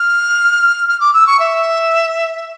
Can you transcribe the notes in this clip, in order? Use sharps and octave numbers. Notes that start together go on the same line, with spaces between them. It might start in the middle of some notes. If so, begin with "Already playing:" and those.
Already playing: F6
F6
D6
E6
C#6
E5